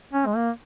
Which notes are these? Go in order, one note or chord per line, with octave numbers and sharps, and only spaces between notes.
C#4
G#3
A#3